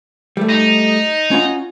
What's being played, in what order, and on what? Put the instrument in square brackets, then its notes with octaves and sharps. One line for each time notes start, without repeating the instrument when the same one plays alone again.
[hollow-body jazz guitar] G3 A3
[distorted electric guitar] D#4
[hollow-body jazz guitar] C#4 F4 F#5